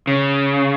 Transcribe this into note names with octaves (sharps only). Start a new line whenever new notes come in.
C#3